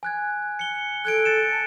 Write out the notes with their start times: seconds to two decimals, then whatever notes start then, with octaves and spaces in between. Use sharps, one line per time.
0.03 G#5 F#6 G#6
0.59 C#7 G7
1.05 A4 F#6 G#6 D7
1.25 A6 C#7 E7
1.51 A5